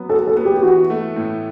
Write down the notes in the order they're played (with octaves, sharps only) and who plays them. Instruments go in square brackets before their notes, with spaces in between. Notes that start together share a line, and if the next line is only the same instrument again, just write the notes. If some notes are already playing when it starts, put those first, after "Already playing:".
Already playing: [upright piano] F#3 B3
[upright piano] F#4 [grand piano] A4
[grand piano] A4
[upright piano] B3
[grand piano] G4
G4
[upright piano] E3 [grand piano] F#4
[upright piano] A3
A2